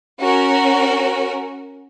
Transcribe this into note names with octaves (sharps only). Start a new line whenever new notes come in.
C#4 F#4 A#4